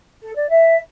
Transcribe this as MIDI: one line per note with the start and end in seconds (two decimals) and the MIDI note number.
0.21 0.33 69
0.36 0.50 74
0.50 0.79 76